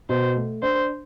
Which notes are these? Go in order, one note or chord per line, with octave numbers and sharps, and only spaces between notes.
B2 C5
A3
D4 C5